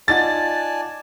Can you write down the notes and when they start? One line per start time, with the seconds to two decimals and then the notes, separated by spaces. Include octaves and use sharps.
0.08 D#4 F4 D5 F#5 G#5 A5 A6